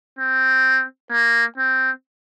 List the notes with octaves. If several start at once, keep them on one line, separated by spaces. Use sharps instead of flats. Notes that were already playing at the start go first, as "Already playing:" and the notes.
C4
A#3
C4